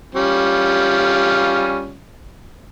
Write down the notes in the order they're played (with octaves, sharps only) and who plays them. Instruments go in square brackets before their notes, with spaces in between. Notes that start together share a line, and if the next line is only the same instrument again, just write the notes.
[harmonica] G3 C#4 F4